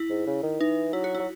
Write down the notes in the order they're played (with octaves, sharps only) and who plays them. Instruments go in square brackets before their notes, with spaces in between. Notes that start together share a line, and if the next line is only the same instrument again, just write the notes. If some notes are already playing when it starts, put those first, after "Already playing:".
Already playing: [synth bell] E4
[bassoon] G#2
C#3
D#3
[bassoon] E3 [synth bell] D#4
[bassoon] F#3 [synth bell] E4
[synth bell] F#4
[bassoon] F#3 [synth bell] E4